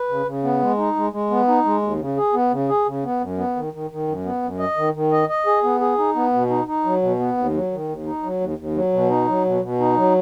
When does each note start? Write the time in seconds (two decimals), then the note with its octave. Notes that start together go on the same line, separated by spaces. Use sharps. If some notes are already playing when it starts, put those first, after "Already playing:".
Already playing: B4
0.09 C#3
0.26 C#3
0.44 B3
0.61 G#3
0.78 D#4
0.96 G#3
1.13 G#3
1.31 B3
1.48 D#4
1.65 G#3
1.82 D#2
2.00 C#3
2.17 G#4
2.34 B3
2.52 C#3
2.69 G#4
2.86 C#3
3.04 B3
3.21 F#2
3.38 B3
3.56 D#3
3.73 D#3
3.91 D#3
4.08 F#2
4.25 B3
4.43 F#2
4.59 D#5
4.77 D#3
4.94 D#3
5.12 D#5
5.29 D#5
5.46 G#4
5.64 B3
5.80 G#4
5.98 D#4
6.16 B3
6.33 B2
6.50 D#4
6.67 D#4
6.85 F#3
7.02 B2
7.19 B3
7.37 D#2
7.54 F#3
7.72 D#3
7.89 D#2
8.06 D#4
8.23 F#3
8.41 D#2
8.58 D#2
8.75 F#3
8.93 B2
9.10 D#4
9.28 F#3
9.45 B2
9.62 B2
9.80 D#4
9.97 F#3